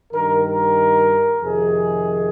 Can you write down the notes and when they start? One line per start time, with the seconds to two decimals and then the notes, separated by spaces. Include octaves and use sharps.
0.12 G2 D#3 A#4
0.45 A#4
1.41 F2 C3 D#3 G#4